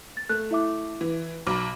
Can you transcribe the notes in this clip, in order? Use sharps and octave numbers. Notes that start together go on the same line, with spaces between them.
A6
A3 F#6
E4 E5 D6
E3
B1 A#5 B5 D6